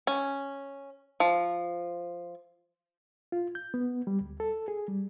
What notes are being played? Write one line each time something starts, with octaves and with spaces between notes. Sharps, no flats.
C#4
F3
F4
G6
B3
G3
D2
A4
G#4
G3